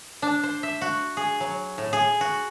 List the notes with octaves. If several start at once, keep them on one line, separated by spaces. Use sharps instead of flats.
D4
C5
E5
F#4
G#4
F#3
A2
G#4
F#4